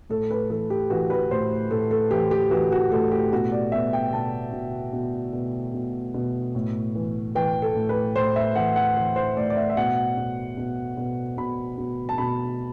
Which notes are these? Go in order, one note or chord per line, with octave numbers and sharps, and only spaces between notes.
A2 A4
B4
E3 A4
G4
E3 F#4
B4
A2 C5
A2 A4
A4
E3 G4
G4
E3 F#4
F#4
A2 A4
G4
B2 F#4
D5
B2 E5
G5
B2 A5
B2
B2
B2
B2
B2
A2
E3
E3 G5
A4
A2
B4
A2 C5
E5
E3 F#5
F#5
E3
C5
A2 D5
D5
E5
E5
B2 F#5
B2
B2
B2
B2 B5
B2
A5
B2 B5